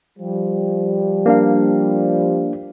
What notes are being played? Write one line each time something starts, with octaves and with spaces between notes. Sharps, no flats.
F3 G3
A#3 D4 F5